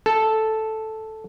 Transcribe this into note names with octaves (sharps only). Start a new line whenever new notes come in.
A4